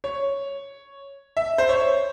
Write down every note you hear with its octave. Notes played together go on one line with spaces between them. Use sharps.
C#5
E5
C5
C#5